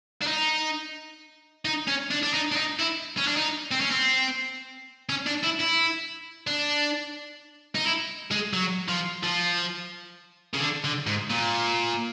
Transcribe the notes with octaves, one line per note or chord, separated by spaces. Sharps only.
D4
D#4
D#4
C#4
D4
D4
D#4
D4
D#4
E4
C#4
D4
D#4
C4
C#4
C4
C#4
D4
E4
E4
D4
D#4
E4
G#3
F#3
F3
F3
C#3
D3
D3
G#2
A#2